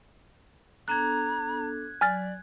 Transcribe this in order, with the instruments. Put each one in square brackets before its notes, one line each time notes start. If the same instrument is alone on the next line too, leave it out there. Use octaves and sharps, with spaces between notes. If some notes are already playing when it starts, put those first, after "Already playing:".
[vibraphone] B3 D4 A4 [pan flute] A#5 [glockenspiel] F#6 G#6
[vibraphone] F#3 [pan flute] D5 [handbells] G#5 F6 A6